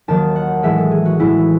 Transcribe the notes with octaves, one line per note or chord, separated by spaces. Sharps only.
D#2 D#3 F#3 A5
F#5
A2 E3 G#3 E5
A4
G#4
F#4
A2 E3 G#3 E4